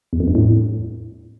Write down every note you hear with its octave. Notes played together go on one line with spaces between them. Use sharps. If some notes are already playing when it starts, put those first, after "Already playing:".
E2
F2
G2
A2